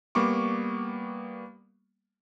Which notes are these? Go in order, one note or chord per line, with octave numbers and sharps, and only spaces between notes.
G3 A#3 B3 C#6 D6